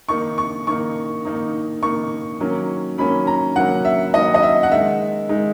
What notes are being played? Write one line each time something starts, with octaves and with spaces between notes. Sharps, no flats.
D#3 A#3 D#4 C#6
C#6
D#3 A#3 D#4 C#6
D#3 A#3 D#4
D#3 A#3 D#4 C#6
D#3 F#3 A#3 C#4
D#3 F#3 A#3 C#4 B5
A#5
D#3 F#3 A#3 C#4 F#5
E5
D#3 F#3 A#3 C#4 D#5
D#5
E5
F#5
D#3 G#3 D#4 E5
D#3 G#3 D#4